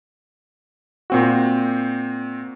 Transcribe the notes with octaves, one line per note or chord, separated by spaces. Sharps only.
A#2 C4 F#4